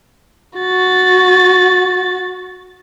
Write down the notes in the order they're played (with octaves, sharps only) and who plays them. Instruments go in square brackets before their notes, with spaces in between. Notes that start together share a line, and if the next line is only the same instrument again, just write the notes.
[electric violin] F#4 A6